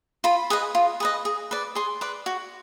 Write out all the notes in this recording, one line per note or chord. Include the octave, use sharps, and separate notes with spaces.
F4 B5
G#4 B4 D#5
F4
G#4 B4 D#5
G#4
B4 D5
G#4 C6
B4 D5
F#4